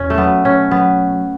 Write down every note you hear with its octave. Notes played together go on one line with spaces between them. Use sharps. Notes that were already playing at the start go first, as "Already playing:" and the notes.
Already playing: E2 B2 C#4
A3
F#3 B3
B2 C#4
F#3 B3